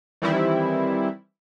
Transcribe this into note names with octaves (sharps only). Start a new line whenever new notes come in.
D#3 E3 G3 C4 E4